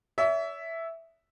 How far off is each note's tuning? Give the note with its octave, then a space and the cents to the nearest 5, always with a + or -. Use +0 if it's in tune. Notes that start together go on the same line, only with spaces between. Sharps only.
C#5 +40 E5 +0